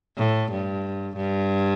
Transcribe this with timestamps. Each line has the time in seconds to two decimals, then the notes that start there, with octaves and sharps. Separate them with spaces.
0.18 A2
0.51 G2
1.16 G2